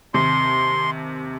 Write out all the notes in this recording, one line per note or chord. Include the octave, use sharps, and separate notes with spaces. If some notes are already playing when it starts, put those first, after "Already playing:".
D#2 C3 C6